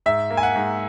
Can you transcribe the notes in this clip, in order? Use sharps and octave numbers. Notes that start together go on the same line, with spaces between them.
G#2 E5
A#3
G#5
F#5
G#2